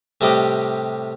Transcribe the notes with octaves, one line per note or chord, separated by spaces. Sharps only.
A2 C3 G3 D#5 D6